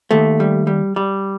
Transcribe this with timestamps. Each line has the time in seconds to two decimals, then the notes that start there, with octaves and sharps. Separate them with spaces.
0.11 D#2 A3
0.40 G3
0.67 G3
0.96 G3